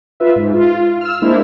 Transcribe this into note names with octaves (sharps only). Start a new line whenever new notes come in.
F4 B4 E5
G#2
F4
E6 F6
G#3 A#3 D4 E4 C5